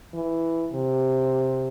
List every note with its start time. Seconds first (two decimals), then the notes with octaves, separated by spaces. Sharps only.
0.14 E3
0.72 C3